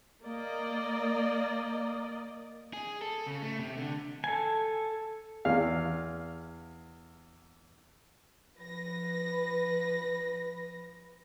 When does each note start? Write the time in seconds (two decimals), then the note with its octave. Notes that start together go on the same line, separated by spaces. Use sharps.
0.25 A#3 D5 D#5
2.73 G#4
3.01 A4
3.27 C#3
3.42 A3
3.59 C3
3.78 D3
4.24 A4 G#5
5.45 E2 F5
8.56 F3 B4 A#6